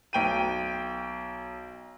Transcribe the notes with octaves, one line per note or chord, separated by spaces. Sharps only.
B1 G5 D#7